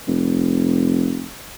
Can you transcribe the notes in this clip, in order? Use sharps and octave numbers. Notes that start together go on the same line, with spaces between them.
F1